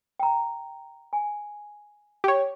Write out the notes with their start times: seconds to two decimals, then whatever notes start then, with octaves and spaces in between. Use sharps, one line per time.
0.20 G5 A#5
1.13 G#5
2.24 G4 C#5